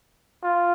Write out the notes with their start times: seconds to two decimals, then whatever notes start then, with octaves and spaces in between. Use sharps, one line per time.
0.43 F4